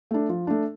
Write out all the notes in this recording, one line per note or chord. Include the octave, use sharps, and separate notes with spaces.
A3 D4
F3
A3 D4